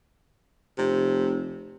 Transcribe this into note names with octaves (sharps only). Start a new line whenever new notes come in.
F1 C3